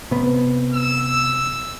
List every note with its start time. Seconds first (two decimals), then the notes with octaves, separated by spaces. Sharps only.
0.11 C3 B3
0.74 E6